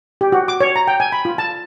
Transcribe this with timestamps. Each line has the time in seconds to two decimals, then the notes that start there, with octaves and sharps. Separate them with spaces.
0.21 G4
0.32 F#4
0.48 D6
0.61 C#5
0.76 A#5
0.88 G5
1.00 G#5
1.12 B5
1.25 F4
1.38 A5